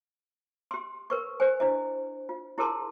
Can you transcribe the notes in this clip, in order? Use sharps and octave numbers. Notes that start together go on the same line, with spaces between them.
G4 C6
A#4 B4 C#6
G4 B4 C5 G#5
D4 E4 D#5
F4
E4 G4 G#4 A#4 A5 C6